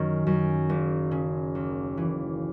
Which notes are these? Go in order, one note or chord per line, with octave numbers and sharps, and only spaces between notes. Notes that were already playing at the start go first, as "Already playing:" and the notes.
Already playing: F#2 D#3
F#2
F#1
C#3
D#2
E3